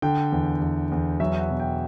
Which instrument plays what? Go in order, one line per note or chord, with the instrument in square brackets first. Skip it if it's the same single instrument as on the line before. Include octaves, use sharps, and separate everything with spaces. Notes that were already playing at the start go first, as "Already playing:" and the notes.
[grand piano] D3 G5
E2
E2
E2
F#3 E5
F#5
B2
G5